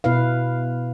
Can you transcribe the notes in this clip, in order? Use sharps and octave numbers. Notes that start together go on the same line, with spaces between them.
B2 E4 B4 F5